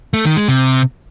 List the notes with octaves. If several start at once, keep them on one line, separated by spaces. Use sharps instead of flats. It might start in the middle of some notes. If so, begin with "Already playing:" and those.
A3
D#3
G#3
C3